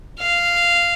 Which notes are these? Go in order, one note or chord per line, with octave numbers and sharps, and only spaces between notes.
F5